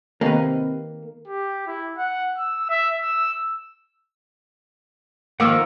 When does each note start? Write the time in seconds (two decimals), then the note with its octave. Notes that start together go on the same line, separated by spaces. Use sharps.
0.21 C3 D#3 A#3 B4
1.28 G4
1.67 E4
1.98 F#5
2.38 E6
2.70 E5
3.01 E6
5.40 D#3 F3 A#3 F#5 D6 E6